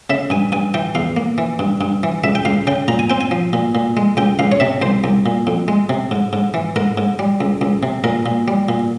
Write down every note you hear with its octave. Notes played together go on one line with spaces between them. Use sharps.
C#3 E5
G2 G#5
G2 G#5
E3 G5
E2 F5
A#3
E3
G2
G2
E3
C#2 E5
G5
C#2 F5
C#3 G5
A#2 A#5
G#5
C4 G5
G#5
F3
A#2
A#2
G#3
C#2 G5
C#2 F5
C#5
C3 E5
C2 C5
C2
A#2
F2
G#3
C3
G#2
G#2
E3
G#2 A#4
G#2
G3
C#2
C#2
C3
A#2 A#4
A#2
G3
A#2